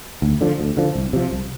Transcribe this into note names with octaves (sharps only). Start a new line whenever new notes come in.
D2
D3 F3
D2
D3 F3
C2
C3 F3
C2